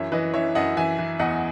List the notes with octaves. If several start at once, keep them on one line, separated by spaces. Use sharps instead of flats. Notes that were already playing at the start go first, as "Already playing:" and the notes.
Already playing: F#2 E3 C#5 E5
E3 B4 D#5
E3 C#5 E5
F#2 D#5 F#5
E3 E5 G#5
E3
E2 D#5 F#5